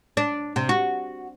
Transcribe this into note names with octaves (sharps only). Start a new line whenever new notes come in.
D4
C3
F#4